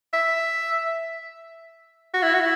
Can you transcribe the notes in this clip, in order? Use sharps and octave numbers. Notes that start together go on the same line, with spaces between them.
E5
F#4
E4
F#4
E4